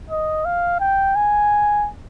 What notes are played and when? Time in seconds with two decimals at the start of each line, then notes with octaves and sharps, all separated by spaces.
0.10 D#5
0.45 F5
0.80 G5
1.15 G#5